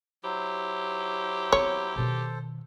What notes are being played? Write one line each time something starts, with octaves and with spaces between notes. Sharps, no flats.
F#3 E4 G4 C5
B3 C4 C#5
B2 D#3 A4 C5